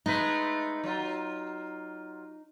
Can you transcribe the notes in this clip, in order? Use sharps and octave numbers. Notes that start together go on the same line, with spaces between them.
G#3 A3 D#4 B4
F#3 F4